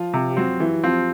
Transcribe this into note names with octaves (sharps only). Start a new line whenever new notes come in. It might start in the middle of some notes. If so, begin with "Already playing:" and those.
Already playing: F3 F4
C3
G4
F#3 C4 F#4
E3
F3 C4 F4